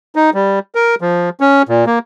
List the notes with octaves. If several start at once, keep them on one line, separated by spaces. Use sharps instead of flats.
D#4
G3
A#4
F3
C#4
A#2
A#3